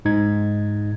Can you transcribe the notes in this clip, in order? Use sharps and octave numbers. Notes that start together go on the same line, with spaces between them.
G#2 D#4 G#6